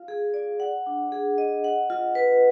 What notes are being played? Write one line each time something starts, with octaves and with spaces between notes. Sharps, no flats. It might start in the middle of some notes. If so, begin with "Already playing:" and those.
Already playing: F4 F5
G#4
D5
F#5
D4
G#4
D#5
F#5
F4
B4